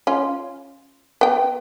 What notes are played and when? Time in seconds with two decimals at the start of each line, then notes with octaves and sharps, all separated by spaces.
0.07 C#4 F4
1.21 B3 G5